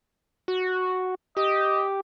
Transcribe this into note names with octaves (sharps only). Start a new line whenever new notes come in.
F#4
G4 D#5